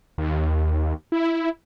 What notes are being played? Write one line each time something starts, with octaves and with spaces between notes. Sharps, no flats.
D#2
E4